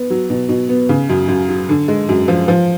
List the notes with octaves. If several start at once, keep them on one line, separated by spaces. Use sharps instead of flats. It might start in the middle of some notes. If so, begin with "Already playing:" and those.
Already playing: B3
F#3
B2
B2
B3
C#3
F#2
F#2
F#3
D3
G#3
F#2
F3
F3